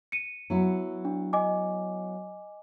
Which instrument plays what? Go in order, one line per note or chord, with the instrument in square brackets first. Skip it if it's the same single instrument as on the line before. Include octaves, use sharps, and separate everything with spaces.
[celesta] C#7 D#7
[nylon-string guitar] F#3 B3 E4
[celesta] D4
D#5 G#5 D6